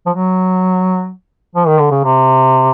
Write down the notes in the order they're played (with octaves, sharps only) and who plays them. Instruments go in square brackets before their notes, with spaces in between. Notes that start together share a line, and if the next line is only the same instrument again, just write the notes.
[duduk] F3
F#3
F3
D#3
D3
C#3
C3